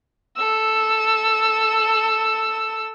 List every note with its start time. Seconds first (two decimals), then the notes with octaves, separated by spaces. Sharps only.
0.36 A4 E6